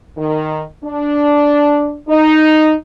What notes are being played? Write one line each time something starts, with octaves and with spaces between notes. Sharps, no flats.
D#3
D4
D#4